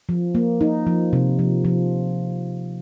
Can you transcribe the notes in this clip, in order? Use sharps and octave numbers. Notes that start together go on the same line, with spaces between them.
F3
A#3
D#4
F3
C3
F3
F3